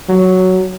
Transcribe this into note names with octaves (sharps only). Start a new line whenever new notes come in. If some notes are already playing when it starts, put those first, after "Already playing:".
F#3